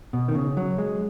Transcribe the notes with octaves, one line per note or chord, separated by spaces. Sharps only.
B2
D#3
C#3
F#3
G#3